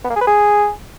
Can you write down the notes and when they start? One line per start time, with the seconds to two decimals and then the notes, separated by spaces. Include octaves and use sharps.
0.04 B3
0.10 A#3
0.16 G#4
0.21 B4
0.27 G#4